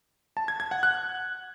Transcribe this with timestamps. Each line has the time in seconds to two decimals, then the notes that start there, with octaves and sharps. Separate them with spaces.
0.37 A5
0.48 G#6
0.60 G#6
0.71 F#5
0.83 F#6